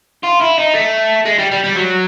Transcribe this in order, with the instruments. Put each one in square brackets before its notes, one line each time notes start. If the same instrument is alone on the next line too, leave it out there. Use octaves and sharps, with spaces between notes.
[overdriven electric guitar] F4
E4
D#4
A3
G#3
G3
G3
G3
F#3